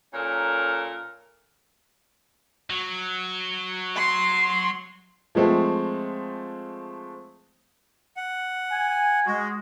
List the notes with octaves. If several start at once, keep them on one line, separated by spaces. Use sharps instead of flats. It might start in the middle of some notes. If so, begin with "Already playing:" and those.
A#2 C#4 A4 A#4
F#3
C6
F3 G#3 A3 C4
F#5
G#5
G#3 F#4